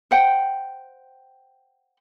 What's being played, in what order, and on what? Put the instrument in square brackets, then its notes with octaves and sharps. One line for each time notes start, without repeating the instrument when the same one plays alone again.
[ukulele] C5 F#5 G5